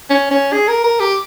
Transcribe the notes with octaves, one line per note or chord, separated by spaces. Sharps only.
C#4
C#4
G#4
A#4
A#4
G4